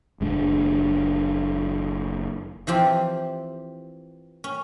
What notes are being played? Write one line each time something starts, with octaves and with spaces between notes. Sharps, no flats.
F#1 G#3 D4
E3 F3 C4 G4
C#4